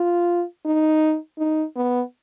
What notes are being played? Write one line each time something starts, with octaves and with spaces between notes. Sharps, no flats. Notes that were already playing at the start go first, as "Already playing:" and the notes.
Already playing: F4
D#4
D#4
B3